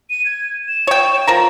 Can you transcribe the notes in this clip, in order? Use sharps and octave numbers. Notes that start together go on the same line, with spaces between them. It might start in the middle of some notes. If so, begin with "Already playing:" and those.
D#7
G#6
E7
C#5 G5
F3 A#4 A#5